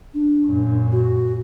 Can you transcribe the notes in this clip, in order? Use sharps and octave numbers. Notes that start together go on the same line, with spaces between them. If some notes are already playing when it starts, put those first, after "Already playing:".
D4
F#2 A#2
F#4